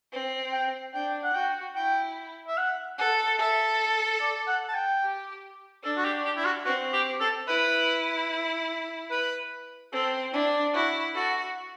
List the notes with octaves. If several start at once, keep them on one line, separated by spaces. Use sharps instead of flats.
C4
G5
D4 G5
F#5
F#4 G5
E4 G5
E5
F#5
A4 F#5
A4 E5
D5
F#5
A5
G5
G4
D4 A4
F#4
G4
G4
E4
F#4
C4 F#4
G4
A4
E4 B4
B4
C4 A4
D4 E4
E4 F#4
F#4 A4